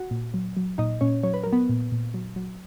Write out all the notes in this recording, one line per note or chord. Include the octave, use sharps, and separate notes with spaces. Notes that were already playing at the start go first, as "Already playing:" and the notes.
Already playing: F#4 F#5
A#2
F#3
F#3
A#2 D#4 D#5
A#2 C#4 C#5
F#3 C#5
B4
F#3 A#4
B3 B4
A#2
A#2
F#3
F#3